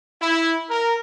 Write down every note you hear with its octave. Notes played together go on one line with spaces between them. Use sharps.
E4
A#4